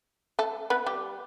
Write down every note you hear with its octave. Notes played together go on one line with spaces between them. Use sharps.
A3 A4
B3 B4
G3 G4